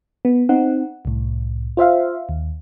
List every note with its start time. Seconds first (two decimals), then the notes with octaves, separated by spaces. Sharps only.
0.25 B3
0.49 C4 D#4 F#5
1.05 C2 A2
1.77 F4 C5 E5 F5
2.29 D#2